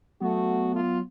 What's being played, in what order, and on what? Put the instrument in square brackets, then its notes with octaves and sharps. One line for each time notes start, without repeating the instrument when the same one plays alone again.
[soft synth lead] F#3 [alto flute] A3 [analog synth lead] B3 [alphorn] F#4
[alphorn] F4